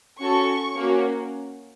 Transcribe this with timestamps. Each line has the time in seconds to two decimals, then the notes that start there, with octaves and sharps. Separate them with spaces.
0.19 C#4 F#4 A4 C#6
0.76 A#3 C#4 F#4